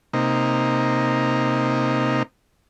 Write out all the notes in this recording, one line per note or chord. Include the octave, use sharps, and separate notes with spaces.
C3 A#3 D#4